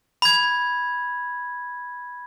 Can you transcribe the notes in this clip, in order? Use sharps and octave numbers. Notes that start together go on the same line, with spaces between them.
B5 G#6